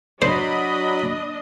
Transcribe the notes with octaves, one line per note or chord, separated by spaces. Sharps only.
F#3 D4 C5 D#5 B5